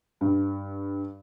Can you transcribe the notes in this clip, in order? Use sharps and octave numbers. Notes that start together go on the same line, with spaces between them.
G2